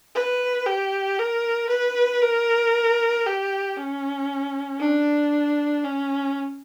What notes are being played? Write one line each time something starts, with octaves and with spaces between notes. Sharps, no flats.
B4
G4
A#4
B4
A#4
G4
C#4
D4
C#4